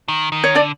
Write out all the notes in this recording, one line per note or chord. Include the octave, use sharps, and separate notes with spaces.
D#3
D#3
C#5
D3 D4 D5